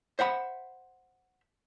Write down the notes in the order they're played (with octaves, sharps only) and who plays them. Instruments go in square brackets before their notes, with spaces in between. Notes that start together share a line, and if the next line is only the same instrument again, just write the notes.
[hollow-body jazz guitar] C5 E5 F#5 B5